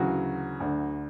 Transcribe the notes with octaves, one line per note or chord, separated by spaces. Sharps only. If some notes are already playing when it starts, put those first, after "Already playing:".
Already playing: D2 C#3 E3 F#3 F#4
D2 D3